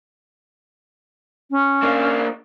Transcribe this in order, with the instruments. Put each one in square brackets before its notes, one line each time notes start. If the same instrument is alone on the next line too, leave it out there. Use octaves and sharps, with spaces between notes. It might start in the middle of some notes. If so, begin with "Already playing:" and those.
[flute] C#4
[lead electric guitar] A#3 D4